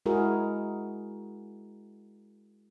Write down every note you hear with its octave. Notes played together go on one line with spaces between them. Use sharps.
G#3 E4 F#4 G#4 A#4